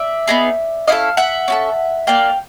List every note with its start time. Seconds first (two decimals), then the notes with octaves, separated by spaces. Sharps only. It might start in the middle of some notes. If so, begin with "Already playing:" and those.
Already playing: D5 E5
0.27 B3 D#4 G#4
0.87 C#4 E4 A4 D#5 F5
1.17 E5 F#5
1.48 C#4 F#4 A4
2.07 A#3 D4 F4 F5 G5